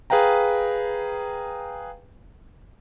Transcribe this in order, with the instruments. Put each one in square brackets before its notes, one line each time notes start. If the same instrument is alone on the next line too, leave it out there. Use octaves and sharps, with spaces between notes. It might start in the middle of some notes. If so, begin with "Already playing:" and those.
[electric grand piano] G#4 B4 F5 G5 A#5